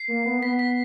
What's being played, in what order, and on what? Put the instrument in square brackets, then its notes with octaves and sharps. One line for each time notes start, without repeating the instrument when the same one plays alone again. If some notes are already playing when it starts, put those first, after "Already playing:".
Already playing: [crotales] C7
[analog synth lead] A#3
B3
[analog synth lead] B3 [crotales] B6
[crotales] B6